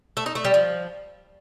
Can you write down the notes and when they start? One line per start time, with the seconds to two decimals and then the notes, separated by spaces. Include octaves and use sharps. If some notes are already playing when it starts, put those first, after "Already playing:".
0.17 A3
0.26 D#4
0.35 A3
0.45 G3
0.54 F3